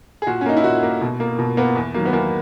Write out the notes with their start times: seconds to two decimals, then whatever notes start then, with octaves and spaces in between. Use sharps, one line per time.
0.22 G#4
0.27 A#2 F#4
0.41 C#4
0.46 A#3 D#4
0.57 E4
0.64 A#2 F#4
0.83 A#3
1.01 B2
1.20 A#3
1.39 B2
1.57 A#3 B3
1.76 E2
1.94 D#3 F#3 A#3
2.05 B3
2.13 E2 A#3